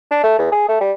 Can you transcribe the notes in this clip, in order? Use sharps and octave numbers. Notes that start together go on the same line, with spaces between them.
D4
A3
E2
G#4
A3
G3